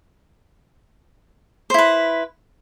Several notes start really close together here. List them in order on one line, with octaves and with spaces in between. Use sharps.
C5 E4 B4